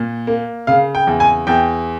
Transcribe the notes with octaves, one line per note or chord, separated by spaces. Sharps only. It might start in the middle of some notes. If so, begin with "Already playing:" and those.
Already playing: A#2
A#3
C#3 F5
G5
E2
G#5
E2 G5